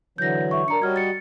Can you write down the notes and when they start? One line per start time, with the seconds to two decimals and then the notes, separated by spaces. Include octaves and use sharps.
0.18 D3 E3 F#3 G6 A#6
0.51 E5 C#6
0.68 D4 A#4 A#5 C#7
0.82 G3 F#4 C#5 D#5 F6 G#6
0.96 A6 C#7